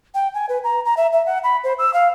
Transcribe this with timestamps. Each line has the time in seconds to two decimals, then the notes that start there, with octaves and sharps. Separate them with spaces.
0.14 G5
0.34 G#5
0.49 B4
0.64 A#5
0.85 A#5
0.97 E5
1.13 E5
1.26 F#5
1.44 B5
1.64 C5
1.79 E6
1.94 F5